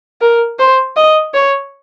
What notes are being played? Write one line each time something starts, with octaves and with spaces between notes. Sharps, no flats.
A#4
C5
D#5
C#5